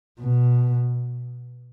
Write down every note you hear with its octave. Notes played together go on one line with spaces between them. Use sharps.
B2